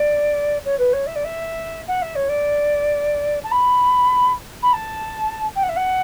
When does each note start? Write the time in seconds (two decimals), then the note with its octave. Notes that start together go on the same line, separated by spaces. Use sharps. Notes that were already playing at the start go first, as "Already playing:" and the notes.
Already playing: D5
0.65 C#5
0.79 B4
0.93 C#5
1.07 E5
1.16 D5
1.25 E5
1.88 F#5
2.02 E5
2.15 C#5
2.29 D5
3.44 A5
3.52 B5
4.63 B5
4.73 A5
5.55 G5
5.63 F#5
5.69 E5
5.76 F#5